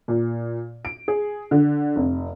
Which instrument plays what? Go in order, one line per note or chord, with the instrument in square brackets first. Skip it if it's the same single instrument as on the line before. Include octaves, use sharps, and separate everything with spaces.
[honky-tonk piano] A#2
D7
G#4
D3
F1